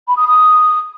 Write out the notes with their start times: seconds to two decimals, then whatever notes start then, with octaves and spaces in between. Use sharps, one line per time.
0.07 B5
0.17 D#6
0.27 D#6